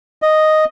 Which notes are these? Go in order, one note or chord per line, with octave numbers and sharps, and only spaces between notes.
D#5